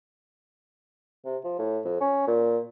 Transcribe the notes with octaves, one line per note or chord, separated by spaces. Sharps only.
C3
F3
A2
F2
C#4
A#2